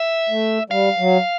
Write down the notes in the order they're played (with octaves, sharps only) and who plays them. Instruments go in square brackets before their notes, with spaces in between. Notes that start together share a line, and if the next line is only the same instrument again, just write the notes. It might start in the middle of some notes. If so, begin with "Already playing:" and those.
Already playing: [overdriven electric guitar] E5
[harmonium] A3
[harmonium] G3 [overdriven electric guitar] F5
[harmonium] F#3